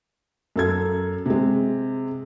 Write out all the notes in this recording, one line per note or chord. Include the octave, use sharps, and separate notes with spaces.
F#2 A4 G#6
C3 G#3